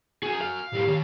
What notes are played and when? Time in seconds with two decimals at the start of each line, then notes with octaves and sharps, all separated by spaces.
0.23 F#4 G#4 G#5
0.41 F5
0.74 A2 G3 G4
0.87 D#3 C#5